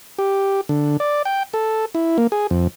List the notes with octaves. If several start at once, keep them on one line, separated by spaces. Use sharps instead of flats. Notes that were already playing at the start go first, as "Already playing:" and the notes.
G4
D3
D5
G5
A4
E4
A#3
G#4
F2